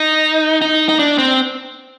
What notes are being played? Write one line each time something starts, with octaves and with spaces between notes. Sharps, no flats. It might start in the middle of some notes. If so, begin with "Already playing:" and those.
Already playing: D#4
D#4
D#4
D4
C4